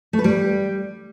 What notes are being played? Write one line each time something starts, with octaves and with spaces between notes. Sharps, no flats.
A3
B4
G3